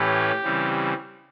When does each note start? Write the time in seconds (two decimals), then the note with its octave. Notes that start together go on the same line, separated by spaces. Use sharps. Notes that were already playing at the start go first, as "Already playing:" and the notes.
Already playing: A2 E3 A3 C#4 G4
0.44 C#3 E3 G3 C4